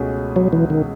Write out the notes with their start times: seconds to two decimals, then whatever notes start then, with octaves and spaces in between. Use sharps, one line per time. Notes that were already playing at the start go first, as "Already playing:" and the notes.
Already playing: C#2 B2 A3 C#4 G#4
0.36 F#3
0.53 E3
0.70 D#3